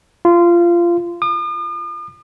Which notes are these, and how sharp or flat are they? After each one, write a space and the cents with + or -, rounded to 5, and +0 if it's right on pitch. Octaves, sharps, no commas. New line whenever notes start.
F4 -20
D#6 -45